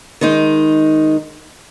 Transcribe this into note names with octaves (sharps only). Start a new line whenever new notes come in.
D#3 G#3 D#4